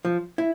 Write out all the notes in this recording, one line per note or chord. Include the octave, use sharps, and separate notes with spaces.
F3
E4